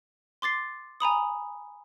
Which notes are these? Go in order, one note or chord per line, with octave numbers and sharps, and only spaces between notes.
C6 D6 A6 C7
G#5 A#5 B5 D#6